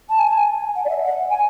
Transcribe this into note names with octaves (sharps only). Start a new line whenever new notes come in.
A5
G#5
F#5
D5
E5
F#5
G#5